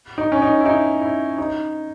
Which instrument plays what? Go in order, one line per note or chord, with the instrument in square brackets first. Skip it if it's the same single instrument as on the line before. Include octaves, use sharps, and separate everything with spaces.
[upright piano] D#4
C#4
D#4
E4
D#4
E4
D#4